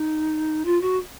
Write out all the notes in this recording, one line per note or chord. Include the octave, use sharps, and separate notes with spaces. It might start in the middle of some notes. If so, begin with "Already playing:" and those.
Already playing: D#4
F4
F#4